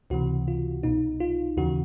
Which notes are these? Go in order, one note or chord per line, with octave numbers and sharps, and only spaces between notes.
C#2 C3 E3 F#4
F4
C2 B2 D#4
F4
D#2 C#3 E3 F#4